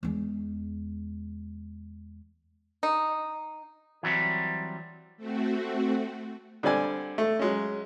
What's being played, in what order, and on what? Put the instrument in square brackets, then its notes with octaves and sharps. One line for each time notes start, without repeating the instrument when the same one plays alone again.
[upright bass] E2 G#3
[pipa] D#4
[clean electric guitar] E3 F#3 G3 C4
[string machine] A3 C4 F#4
[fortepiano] D3 G3 C4 D5 G#5
A3
F#3 G#3 C#4